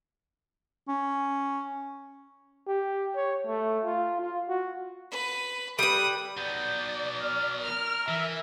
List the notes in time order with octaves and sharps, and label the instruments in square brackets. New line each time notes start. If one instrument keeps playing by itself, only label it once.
[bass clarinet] C#4
[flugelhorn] G4
C#5
A3
F4
F4
F#4
[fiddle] B4
[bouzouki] G3 B4 [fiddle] D#6
[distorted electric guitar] F#3 B3 [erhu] D5 [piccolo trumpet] G6
[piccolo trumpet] F6
[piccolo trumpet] A#4 [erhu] F6
[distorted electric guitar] E3 [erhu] E5